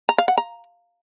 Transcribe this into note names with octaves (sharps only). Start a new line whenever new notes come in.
A#5
F5
F#5
A#5